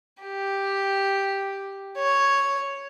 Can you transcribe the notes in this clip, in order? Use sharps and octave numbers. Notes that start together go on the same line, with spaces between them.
G4
C#5